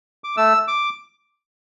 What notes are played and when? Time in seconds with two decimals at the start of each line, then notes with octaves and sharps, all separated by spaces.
0.24 D6
0.37 A3 E6
0.68 D6